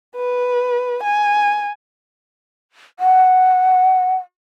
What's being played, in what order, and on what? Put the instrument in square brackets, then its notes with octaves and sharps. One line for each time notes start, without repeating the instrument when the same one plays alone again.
[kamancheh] B4
G#5
[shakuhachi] F#5